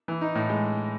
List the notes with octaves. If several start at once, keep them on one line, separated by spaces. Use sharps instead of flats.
E3
D#4
A2
G#3